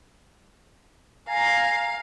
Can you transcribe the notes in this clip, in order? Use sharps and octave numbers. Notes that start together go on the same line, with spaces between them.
F5 G#5 A#5